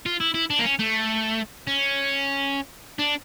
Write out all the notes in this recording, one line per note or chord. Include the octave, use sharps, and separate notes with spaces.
F4
E4
E4
D4
A#3
C#4
A3
C#4
D4